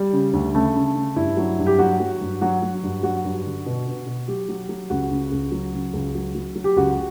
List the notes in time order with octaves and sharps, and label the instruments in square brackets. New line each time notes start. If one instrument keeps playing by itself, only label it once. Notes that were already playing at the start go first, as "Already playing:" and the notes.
Already playing: [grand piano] G3
C#3
D2
C#3 A3
C#3
C#3
G2 E4
F#3
G2
G4
F#3 F#4
F#3
G2
F#3 F#4
F#3
G2
F#3 F#4
G2
D3
B2
B2
B2
F#3 G4
F#3
F#3
C#2 F#4
C#3
C#2
F#3
C#3
C#2
F#3
F#3
F#3
G4
C#2 F#4